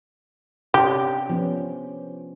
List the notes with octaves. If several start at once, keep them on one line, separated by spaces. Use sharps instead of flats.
C3 C#4 D4 G4
F3 B3 C#4